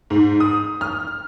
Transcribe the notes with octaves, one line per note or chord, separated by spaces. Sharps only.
G#2
D#6
F6